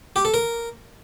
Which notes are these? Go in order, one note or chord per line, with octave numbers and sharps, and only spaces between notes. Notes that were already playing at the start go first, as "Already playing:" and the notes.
G4
A4
A#4